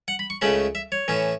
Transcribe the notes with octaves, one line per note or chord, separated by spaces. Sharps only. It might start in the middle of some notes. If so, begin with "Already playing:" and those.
F#5
B5
C#6
C#2 C#3 A3 C#4 B5
E5
C#5
A2 E3 C#4